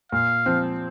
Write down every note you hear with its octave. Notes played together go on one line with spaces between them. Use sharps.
A#2 F5
F3 C4